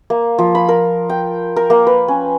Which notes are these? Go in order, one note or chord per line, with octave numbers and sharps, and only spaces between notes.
A#3
F3
B5
A#4
G5
A#4
A#3
B4
C#4